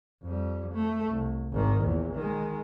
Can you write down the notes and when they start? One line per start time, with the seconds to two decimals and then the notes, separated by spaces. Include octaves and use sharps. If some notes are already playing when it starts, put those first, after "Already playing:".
0.22 F2 G3
0.72 A3
1.10 C2
1.52 G#1 D#3
1.81 A#1 E2
2.15 D#3 G#3